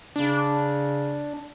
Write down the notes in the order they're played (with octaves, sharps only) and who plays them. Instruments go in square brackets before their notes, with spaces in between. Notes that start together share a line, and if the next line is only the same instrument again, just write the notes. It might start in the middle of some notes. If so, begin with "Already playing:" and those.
[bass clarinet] C#3 [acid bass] D4